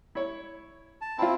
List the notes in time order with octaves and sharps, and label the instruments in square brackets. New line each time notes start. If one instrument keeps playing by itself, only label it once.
[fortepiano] E4 C#5
[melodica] A5
[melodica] C4 E4 [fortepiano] F4 A5